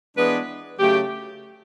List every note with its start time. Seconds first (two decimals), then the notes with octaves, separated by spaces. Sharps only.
0.17 E3 G#3 B3 D4 B4
0.79 C#3 F#3 A3 G4